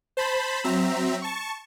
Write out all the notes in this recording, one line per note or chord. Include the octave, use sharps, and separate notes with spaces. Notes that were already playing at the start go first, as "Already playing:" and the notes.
C5 A5 B5
F#3 C4 E5 A#5
A5 C#6